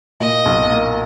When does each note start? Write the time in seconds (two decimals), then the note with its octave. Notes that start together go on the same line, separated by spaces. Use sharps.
0.20 A#2 D#5
0.46 B1
0.70 A#3